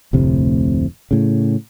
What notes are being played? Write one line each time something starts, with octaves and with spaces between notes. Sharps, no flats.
F1 D2 A2 C3
A2 C#3